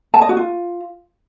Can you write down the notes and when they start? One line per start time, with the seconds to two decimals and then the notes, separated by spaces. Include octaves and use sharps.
0.14 A5
0.21 D#5
0.29 F#4
0.37 F4